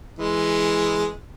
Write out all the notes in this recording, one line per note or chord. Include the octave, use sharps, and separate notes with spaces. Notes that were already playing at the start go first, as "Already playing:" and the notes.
E3 G#3